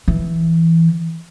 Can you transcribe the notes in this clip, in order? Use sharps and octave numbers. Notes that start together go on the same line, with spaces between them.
E3